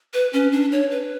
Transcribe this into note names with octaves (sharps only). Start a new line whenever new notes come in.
B4
C#4
D4
C#5
B4